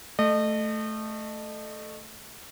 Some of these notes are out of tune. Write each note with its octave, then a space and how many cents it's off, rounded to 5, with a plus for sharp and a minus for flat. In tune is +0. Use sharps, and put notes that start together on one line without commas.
A3 -5 D#5 -30